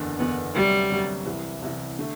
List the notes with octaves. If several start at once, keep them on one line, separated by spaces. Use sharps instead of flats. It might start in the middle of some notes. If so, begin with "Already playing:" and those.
Already playing: F#1 E2 D3
F#1 E2 D3 B3
D2 C3 F#3 G3
D2 C3 F#3
C2 C3 E3
C2 C3 E3
D3 A3